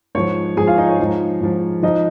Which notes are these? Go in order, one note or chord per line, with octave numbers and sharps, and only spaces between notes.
G#2 F3 C#5
G#2 F3 G#4 G#5
F4 F5
D#4 D#5
C#5
G#2 F3
G#2 F3
F3 D#4 D#5